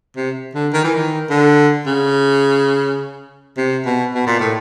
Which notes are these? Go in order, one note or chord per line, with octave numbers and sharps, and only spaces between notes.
C3
D3
D#3
E3
D#3
D3
C#3
C3
B2
B2
A#2
A2